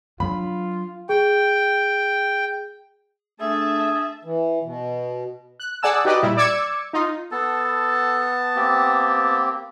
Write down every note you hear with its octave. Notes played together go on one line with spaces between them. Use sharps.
F#3 D4 F4 B5
G#4 G5
A3 D4 G#4 E5 A5
E3
B2
F#6
G#4 D5 F#5 G#5 A5 E6
D#4 F#4 G4 B4 D5 D#5
A#2 G3 E4
D5 D6 E6 G#6 C#7
D#4 F4
B3 A4 A5
A#3 C4 G4